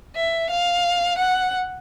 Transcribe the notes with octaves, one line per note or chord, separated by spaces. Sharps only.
E5
F5
F#5